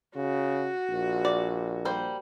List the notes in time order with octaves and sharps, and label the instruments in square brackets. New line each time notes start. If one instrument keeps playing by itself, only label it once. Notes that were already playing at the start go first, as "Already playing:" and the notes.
[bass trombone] C#3 [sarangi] F#4
[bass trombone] A#1
[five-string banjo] D5
G3 A#3 C5